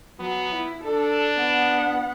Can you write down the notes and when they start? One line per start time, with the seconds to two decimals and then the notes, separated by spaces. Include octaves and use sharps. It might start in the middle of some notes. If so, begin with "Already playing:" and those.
0.19 F#3 B3
0.54 E4
0.83 D4 A4
1.37 B3 F#5